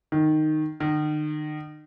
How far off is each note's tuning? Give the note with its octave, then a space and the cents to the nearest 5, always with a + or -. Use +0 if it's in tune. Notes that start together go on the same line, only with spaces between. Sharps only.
D#3 -10
D#3 -40